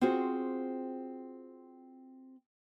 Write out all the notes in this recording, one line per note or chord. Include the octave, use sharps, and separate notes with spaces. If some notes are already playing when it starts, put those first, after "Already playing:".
C4 F4 F#4 G#4 C5